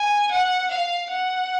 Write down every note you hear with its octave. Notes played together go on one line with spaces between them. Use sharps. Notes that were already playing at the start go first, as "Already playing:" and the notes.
Already playing: G#5
F#5
F5
F#5